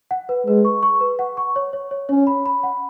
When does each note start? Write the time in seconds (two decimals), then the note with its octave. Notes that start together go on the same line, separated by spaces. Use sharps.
0.11 F#5
0.29 B4
0.47 G#3 B4
0.65 C#6
0.83 C#6
1.01 B4
1.19 F#5
1.37 C#6
1.56 C#5
1.73 C#5
1.91 C#5
2.09 C#4 C#5
2.27 B5
2.46 B5
2.63 F#5